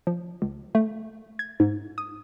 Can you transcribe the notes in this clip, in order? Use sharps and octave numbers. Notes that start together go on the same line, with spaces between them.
F3
C#2
A3
G#6
G#2
D#6